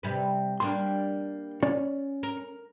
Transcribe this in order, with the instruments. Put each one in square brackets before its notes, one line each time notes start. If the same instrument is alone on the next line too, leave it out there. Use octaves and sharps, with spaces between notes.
[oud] C3 G3 B4
[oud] G3 A#3 D4 [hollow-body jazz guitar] C6
[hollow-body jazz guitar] C#4 C#5 D5
[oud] A#4